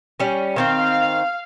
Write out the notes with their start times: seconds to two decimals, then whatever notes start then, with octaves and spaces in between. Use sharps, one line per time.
0.20 G3 C#4
0.56 D#3 C4 F5 G5